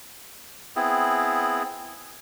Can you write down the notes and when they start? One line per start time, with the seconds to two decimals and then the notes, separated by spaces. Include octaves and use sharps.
0.76 B3 C4 E4 G#4